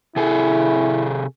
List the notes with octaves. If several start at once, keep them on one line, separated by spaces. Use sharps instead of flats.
C3 E4 G#4 A4